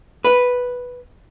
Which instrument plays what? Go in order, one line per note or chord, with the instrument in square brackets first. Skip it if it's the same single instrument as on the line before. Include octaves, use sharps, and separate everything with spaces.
[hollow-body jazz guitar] B4